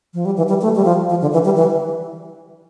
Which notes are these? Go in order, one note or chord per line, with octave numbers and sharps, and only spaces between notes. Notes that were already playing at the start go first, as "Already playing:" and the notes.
F3
G3
E3
G3
A3
G3
F3
F3
D3
E3
G3
E3